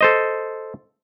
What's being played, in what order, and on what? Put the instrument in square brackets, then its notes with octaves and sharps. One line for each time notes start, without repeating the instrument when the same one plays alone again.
[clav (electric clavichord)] A4 C5 D#5